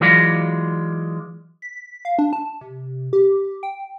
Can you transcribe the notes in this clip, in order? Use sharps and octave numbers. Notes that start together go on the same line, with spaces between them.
E3 F#3 G#3 F4 D5
B6
F5
D4
A5
C3
G4
G5